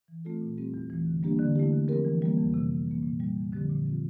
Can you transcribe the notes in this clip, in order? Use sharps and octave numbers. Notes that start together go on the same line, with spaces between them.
E3
A3 C4 F4 A4
A#2
G3 C4 G4
E2
E3 A3
D3
G3 A#3 D4 G4
D3
A3 E4 G4
D3
F3 C4 G4 A#4
E3
G3 A#3
F2
C3 E3
C3
E3 A#3
A#2
G3 A#3
F2
D3 F3 C4 G4
A#2
F3 C4 F4